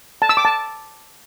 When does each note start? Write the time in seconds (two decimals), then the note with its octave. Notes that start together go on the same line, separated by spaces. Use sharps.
0.22 A5
0.29 E6
0.37 D6
0.45 A5